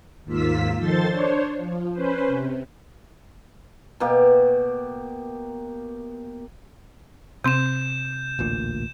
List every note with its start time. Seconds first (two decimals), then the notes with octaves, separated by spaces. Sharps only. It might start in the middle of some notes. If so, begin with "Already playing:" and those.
0.24 D#2 G#2 A#3 F4 E6 B6
0.77 D#3 F3 A4 C5 C6 A6
1.06 D4 C5 C#5
1.56 F3
1.93 C#4 B4 C5
2.27 C3
4.00 B2 A#3 G4
7.44 C3 C4 G6 E7
8.39 A1 D2 A#2